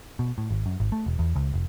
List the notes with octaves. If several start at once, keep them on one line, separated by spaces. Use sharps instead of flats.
B2
A2
G#1
F#2
G#1
A3
E1
E2
C#2
F1